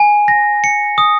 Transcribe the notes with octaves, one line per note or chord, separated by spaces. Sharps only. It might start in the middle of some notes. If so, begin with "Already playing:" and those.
Already playing: G#5
A#6
C#7
D#6